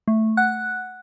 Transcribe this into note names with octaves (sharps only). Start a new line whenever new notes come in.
A3
F#5 F#6